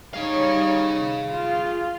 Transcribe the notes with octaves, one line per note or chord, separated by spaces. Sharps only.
G3 D#4 G#4 C#5 F5
F4